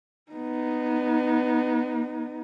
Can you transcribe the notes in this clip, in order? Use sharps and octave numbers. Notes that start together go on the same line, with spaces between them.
B3 D#4